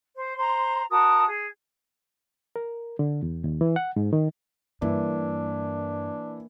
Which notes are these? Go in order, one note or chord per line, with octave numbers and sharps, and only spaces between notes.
C5
C5 A#5 C6
F#4 A#4 A5 D#6
G#4
A#4
D3
E2
D#2
E3
F#5
G#2
D#3
G2 E3 A#3 D4